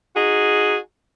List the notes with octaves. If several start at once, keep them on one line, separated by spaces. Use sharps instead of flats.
D#4 F#4 G#4